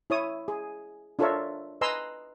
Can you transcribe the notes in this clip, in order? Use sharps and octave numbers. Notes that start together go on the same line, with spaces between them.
E4 C#5 D#6
G#4
D4 F4 A4 A#4 C#5 E5
B4 D#5 G#5 A#5 C6 E6